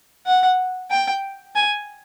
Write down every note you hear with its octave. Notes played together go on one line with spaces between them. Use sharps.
F#5
G5
G#5